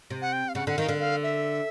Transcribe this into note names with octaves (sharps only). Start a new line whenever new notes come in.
C3
F#5
G5
F5
C#3 F#5
D3 F#5
D#3 F5
D3
F5
E5